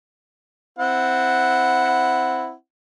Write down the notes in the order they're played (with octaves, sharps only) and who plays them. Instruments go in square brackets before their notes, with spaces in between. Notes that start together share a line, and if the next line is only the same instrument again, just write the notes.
[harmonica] C4 E4 F#5